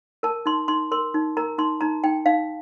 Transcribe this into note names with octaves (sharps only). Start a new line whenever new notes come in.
A#4 A5
D#4 C6
D#4 C6
A#4 C6
D#4
A#4 A#5
D#4 C6
D#4 A#5
D#4 G5
D#4 F5